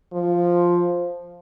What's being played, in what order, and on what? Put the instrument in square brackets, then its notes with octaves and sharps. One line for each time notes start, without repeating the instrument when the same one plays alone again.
[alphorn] F3